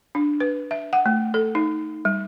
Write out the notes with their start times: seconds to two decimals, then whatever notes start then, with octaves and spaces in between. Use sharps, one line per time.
0.15 D4
0.40 B4
0.71 E5
0.93 F#5
1.06 A3
1.34 A4
1.55 D#4
2.05 G3